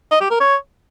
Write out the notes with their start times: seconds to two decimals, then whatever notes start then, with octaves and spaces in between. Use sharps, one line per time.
0.11 D#5
0.21 G4
0.31 A#4
0.40 C#5